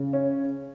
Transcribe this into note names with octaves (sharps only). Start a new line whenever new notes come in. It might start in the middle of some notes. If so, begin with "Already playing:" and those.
Already playing: C#3
C#4